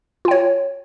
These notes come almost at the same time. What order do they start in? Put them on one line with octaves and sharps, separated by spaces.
F4 G5 C#5